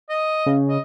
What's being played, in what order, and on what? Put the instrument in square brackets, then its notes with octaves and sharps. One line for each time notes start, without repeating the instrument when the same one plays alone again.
[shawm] D#5
[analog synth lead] C#3
[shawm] D#5